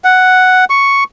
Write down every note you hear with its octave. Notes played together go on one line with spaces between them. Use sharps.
F#5
C#6